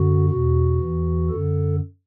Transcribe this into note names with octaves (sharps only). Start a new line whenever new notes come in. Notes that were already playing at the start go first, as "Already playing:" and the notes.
Already playing: F#2 D3 F#4
E2 B2 F#4
E2 E3
F#2 D3 A4